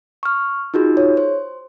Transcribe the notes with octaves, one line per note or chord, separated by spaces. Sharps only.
C#6 F6
D#4 F4 F#4 G#4
C#5
C5